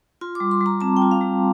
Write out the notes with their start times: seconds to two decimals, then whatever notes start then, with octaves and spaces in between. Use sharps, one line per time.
0.21 F4 C6
0.35 D6
0.40 G3
0.51 C6
0.61 G3
0.66 A#5
0.81 C4 A5
0.97 G5
1.02 F4
1.11 F5
1.21 G3